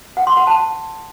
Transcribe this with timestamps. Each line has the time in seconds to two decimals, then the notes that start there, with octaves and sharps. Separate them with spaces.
0.17 F#5
0.27 C6
0.37 F#5
0.47 A5